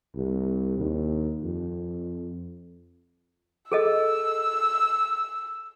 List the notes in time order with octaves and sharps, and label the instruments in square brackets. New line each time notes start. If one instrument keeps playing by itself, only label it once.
[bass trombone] C2
D#2
F2
[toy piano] G#4 A4 D#5 [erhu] E6